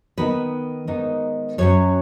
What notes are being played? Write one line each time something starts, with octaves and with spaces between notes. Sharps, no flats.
D#3 B3 D#4 B4
G#2 D#3 B3 D#4
F#2 F#3 C#4 C#5